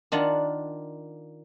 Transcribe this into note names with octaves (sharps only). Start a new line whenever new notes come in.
D#3 D4 F4 F#5